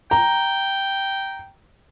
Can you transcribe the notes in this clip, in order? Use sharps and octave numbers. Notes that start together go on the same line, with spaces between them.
G5 A#5